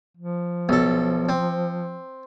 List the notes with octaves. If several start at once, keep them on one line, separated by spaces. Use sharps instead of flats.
F3
B1 A4
C4